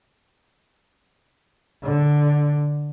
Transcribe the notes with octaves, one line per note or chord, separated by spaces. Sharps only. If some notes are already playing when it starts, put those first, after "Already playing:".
D3